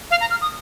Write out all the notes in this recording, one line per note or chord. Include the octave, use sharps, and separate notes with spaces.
F5
A#5
F6
D#6